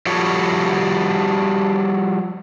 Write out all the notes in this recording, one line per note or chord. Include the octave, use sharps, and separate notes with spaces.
F3 G3 F#4 A4 C#5